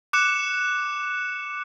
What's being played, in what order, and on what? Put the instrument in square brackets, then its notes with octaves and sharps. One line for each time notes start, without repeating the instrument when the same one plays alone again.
[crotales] D6 F#6 C#7 E7